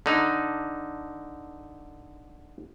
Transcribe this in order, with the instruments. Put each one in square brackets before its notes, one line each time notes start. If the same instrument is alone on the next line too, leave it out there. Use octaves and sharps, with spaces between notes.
[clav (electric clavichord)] D3 D#4